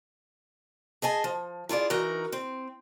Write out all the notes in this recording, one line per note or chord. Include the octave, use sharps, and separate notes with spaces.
G#4 D#5 G#5 A5
F3
E4 F4 G#4 D5
E3 D#4 F#4 A#4
C4